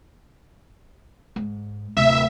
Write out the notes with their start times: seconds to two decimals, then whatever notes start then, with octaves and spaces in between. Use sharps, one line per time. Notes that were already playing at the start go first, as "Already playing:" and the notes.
1.36 G#2
1.97 D1 C3 E5